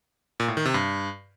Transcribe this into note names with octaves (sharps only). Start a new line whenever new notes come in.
A#2
A2
D#3
C3
G2